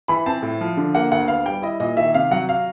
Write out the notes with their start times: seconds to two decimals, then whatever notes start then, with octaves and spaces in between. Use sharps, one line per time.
0.08 E3 B5
0.26 C4 A5
0.42 A2
0.61 F3
0.77 D3
0.95 A#3 F#5
1.11 D2 F#5
1.28 B3 F5
1.46 G3 G5
1.62 E4 D#5
1.80 A#2 D#5
1.97 D#3 E5
2.14 C3 F5
2.31 F#3 F#5
2.49 F5